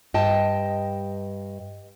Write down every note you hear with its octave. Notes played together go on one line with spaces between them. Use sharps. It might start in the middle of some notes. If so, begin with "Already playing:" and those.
G2 D#5 G5 A5